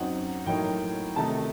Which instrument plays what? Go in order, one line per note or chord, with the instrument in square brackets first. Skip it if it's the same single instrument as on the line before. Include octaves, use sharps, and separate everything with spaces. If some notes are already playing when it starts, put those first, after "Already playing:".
Already playing: [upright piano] F#2 F#3 C4 D#4 F#5
A2 F#3 A#3 D#4 G5
C3 D#3 A3 D#4 A5